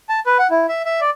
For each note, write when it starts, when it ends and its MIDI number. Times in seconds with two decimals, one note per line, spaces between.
0.09 0.20 81
0.26 0.37 71
0.39 0.47 78
0.51 0.66 64
0.69 0.82 76
0.85 1.00 76
1.01 1.10 74